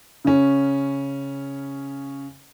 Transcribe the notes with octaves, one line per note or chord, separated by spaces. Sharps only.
C#3 C#4